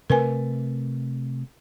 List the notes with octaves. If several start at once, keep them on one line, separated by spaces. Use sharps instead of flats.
C3 A3 A#4 B4 G#5